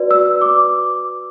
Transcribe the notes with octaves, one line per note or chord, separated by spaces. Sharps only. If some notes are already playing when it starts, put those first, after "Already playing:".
Already playing: F#4 B4 D5
E6
D6